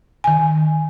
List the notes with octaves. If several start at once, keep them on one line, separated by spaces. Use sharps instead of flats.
D#3 G#5